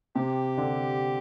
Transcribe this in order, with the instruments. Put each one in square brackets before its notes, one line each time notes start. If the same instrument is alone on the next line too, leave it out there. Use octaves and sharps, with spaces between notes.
[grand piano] C3 [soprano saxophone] G4
[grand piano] D3